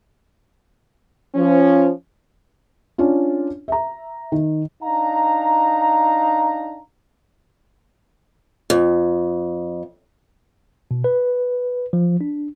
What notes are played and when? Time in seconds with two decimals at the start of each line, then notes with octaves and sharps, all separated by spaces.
1.35 F3 C#4
2.98 C#4 D4 F4
3.68 E5 A#5
4.32 D#3
4.83 D4 D#4 F5 A#5
8.70 F2
10.91 B2
11.04 B4
11.93 F3
12.21 D4